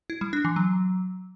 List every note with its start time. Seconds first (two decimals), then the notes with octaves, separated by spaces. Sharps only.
0.10 E4
0.21 G3
0.33 D4
0.45 E3
0.56 F#3